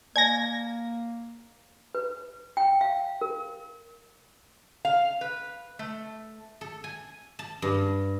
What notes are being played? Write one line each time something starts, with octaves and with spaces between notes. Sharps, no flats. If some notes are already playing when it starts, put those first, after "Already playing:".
A#3 D5 G#5 G#6 A#6
B4
G5
F5
A#4
F5
B4
A3
A4
G#5
A5
G2